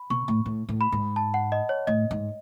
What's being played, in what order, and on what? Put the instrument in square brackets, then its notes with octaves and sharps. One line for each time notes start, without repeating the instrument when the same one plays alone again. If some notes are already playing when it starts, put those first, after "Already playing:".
Already playing: [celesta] B5
[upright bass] B2 [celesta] C#6
[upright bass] A2
A2
A2
[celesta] B5
[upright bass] G#2
[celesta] A5
F#5
D#5
C#5
[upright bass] A2 [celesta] D#5
[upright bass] G#2